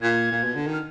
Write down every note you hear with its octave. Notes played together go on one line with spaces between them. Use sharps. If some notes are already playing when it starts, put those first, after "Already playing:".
A#2 G#6
A#2
B2
D3
D#3
F6